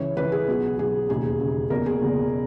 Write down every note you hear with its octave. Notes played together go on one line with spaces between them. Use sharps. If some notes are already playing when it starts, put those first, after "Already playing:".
Already playing: C#2 C#3 E3 C#5
C#2 C#3 E3 B4
G#4
B1 B2 F#3
B1 B2 F#3 G#4
E1 D#2 C#3 G#4
E1 D#2 C#3
F#1 E2 B2 A#4
G#4
F#1 E2 B2